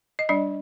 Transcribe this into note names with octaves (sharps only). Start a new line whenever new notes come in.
D#5
G3 D4 D5